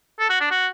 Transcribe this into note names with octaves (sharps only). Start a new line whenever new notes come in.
A4
F#4
D4
F#4